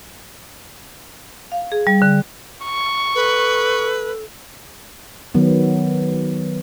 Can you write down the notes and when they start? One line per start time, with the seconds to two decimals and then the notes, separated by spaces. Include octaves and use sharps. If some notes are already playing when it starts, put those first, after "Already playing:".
1.52 F5
1.72 G#4
1.87 G3
2.02 D3
2.65 C#6
3.15 A4 B4
5.35 D#3 F#3 B3